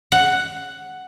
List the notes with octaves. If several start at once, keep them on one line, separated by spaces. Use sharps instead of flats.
F#5